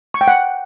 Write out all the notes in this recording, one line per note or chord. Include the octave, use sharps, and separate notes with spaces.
C#6
G5
F#5